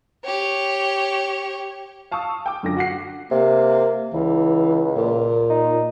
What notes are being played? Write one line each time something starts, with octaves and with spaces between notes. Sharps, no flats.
G4 C#5
F5 A5 C#6 D#6 E6
G5 D6
F#2 D3 F4 A#6
F#4 F#5 C7
C3 A#3
C#2 E3
A#2
D#4